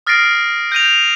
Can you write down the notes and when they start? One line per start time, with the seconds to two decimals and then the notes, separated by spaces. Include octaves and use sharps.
0.07 D#6 F6 A6 A#6 C7 D7
0.72 G6 A#6 D#7 F7